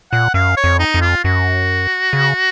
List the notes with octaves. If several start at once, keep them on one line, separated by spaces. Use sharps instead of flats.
A#2 F#5
F#2 F5
C#5
F2
D#4
F2
F4
F#2 F#4
C#3